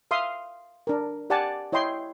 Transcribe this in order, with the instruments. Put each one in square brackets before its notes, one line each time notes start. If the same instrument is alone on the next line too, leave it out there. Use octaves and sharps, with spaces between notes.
[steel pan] E5 F5 C6 D#6
D4 A#4
G4 D5 F#5 G#5 A5
E4 C#5 D#5 G5 C6